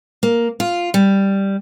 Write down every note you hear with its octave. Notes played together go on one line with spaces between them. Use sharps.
A#3
F4
G3